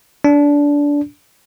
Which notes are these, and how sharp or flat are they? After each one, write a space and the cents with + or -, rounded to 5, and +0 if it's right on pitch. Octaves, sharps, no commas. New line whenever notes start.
D4 -20